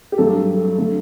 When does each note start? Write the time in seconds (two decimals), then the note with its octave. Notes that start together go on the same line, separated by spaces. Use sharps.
0.12 G4
0.18 G2 F#3 A3 A4
0.78 D3 A3